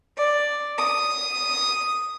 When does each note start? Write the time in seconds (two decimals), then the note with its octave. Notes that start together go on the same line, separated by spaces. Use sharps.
0.16 D5
0.78 D#6